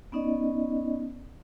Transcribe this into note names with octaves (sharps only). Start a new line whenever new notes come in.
B3 C#4 D#4 D5 D#5